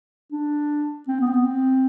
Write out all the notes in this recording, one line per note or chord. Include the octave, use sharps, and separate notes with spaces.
D4
C4
B3
C4
B3
C4